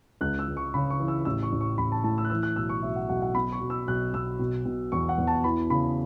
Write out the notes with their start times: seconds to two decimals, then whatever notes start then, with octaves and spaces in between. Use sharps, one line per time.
0.21 C#2 F#6
0.39 E6
0.48 C#2
0.57 C#6
0.74 C#3 B5
0.90 C#6
1.00 E3
1.08 E6
1.25 A1 E6
1.43 C#6
1.52 A1
1.61 C#6
1.78 A1 B5
1.92 A5
2.04 A2 A5
2.18 E6
2.25 F#6
2.30 E3 E6
2.43 F#6
2.56 B1 E6
2.69 C#6
2.82 B1 E5
2.96 F#5
3.09 B1 F#5
3.22 F#5
3.34 B2 B5
3.52 C#6
3.61 B1
3.70 E6
3.87 B1 F#6
4.13 B1 E6
4.39 B2
4.65 B2
4.92 E2 C#6
5.09 F#5
5.18 E2
5.27 A5
5.44 E3 B5
5.70 C#3 B5